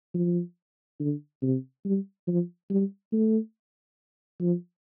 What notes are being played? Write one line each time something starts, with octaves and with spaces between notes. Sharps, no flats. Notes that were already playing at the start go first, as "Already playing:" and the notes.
F3
D3
C3
G3
F3
G3
A3
F3